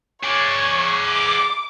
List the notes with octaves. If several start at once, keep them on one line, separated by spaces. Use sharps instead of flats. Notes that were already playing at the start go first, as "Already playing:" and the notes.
G#4 C#5 D5
D6